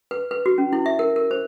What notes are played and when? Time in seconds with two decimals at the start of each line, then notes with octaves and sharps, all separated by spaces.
0.11 B4
0.31 B4
0.46 F#4
0.58 C#4
0.73 E4
0.86 E5
0.99 A#4
1.16 A#4
1.31 C5